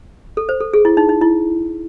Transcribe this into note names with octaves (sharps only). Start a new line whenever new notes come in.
A4
C5
A4
G#4
E4
D#4
D#4
E4